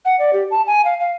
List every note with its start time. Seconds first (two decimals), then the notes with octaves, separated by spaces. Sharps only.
0.05 F#5
0.19 D5
0.33 G4
0.51 A5
0.67 G#5
0.85 F5
1.00 F5